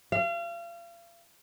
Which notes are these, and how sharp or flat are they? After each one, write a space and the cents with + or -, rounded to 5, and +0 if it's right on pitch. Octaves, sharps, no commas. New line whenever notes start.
F5 -35